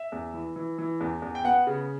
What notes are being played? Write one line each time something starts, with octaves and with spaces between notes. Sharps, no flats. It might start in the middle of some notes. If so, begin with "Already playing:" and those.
Already playing: E5
E2
E3
E3
E3
E2
E2
G5
B3 F#5
C#3